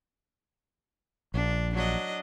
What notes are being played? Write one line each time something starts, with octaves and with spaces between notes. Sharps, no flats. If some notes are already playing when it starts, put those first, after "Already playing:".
A#1 D4
F#3 D4 D#5